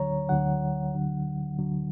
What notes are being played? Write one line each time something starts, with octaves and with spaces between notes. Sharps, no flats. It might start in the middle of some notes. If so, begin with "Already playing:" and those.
Already playing: D2 D3 F#3 C#5 A#5
D2 D3 F#3 F#5
D2 D3 F#3
D2 D3 F#3